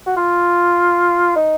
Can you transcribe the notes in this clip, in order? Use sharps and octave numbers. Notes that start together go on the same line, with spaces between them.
F#4
F4
D#4